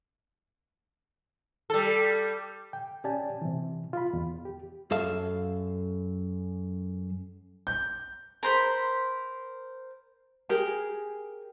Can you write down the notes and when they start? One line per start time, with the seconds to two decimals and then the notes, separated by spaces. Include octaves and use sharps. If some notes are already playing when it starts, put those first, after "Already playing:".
1.70 G3 A4
2.73 G5
3.04 C#4 G4 D5 G#5 A5
3.42 C3 E3
3.93 F4 B5
4.13 E2
4.45 G4
4.91 F#2 A4 E5 F5
7.67 G6
8.43 A#4 C5 B5
10.49 G4 G#4 A#4 G#5